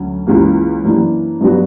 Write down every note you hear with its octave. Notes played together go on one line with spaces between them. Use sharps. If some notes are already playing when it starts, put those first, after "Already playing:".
Already playing: D2 F#3 C#4
C#2 C#3 E3 A#3
F#2 E3 A#3 D4
G2 F#3 B3 D4 F#4